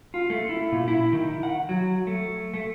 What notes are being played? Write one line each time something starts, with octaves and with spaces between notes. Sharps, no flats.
F4
A3
E4
A#2
E4
D#3
F#5
F#3
A3
A3